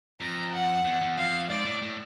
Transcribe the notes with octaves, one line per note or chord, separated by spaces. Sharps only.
F2 A#5
F#5
E2
E2
F2 F5
G#2 D5
A2
A2